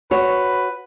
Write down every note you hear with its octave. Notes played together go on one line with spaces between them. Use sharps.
F#4 B4 C#5